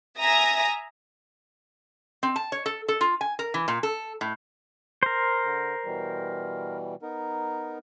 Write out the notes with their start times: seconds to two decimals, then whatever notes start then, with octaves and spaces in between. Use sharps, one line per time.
0.19 E5 G#5 A#5 D#6 A#6
2.23 C4
2.36 A5
2.52 C#5
2.66 A4
2.88 A4
3.01 F4
3.21 G#5
3.39 A#4
3.54 E3
3.68 A#2
3.83 A4
4.21 A2
5.03 A#4 C5
5.44 D3
5.85 B2 E3 G3
7.02 B3 D#4 A#4